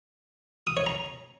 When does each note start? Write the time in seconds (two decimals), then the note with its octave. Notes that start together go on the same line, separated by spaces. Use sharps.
0.67 D#6
0.77 C#5
0.86 A#5